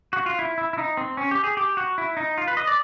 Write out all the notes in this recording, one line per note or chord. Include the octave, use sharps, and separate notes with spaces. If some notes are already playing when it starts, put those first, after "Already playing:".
F#4
F4
E4
E4
E4
D#4
C4
C#4
G4
G#4
G4
F#4
E4
D#4
F4
B4
D#5
D5